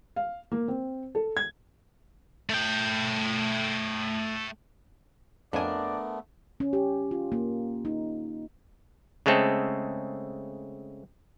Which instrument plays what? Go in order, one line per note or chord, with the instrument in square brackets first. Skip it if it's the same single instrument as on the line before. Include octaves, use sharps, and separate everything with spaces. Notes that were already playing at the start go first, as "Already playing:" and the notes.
[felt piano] F5
A#3
C4
A4
G#6
[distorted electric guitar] A3 G5
[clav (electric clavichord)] F2 G#5 [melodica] A3 B3 [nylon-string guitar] D4 A#4 [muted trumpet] D5
[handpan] C#4
G4
F4
A#3
D#4
[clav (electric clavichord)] C#3 G#3 A3 C4 A4